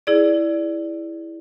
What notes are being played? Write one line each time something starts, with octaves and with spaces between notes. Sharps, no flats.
E4 G#4 D5